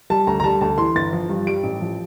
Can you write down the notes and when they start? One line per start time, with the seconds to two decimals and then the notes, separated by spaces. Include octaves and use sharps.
0.10 G3 A5
0.27 D2 A#5
0.40 A#5
0.44 G3 A5
0.61 D2 A5
0.78 E3 C6
0.95 G1 A6
1.13 F3
1.30 G2
1.47 G3 D7
1.63 A1
1.81 F3